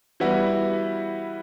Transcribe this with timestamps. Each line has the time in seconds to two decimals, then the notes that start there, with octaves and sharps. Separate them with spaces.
0.20 E3 G3 B3 E4 F#4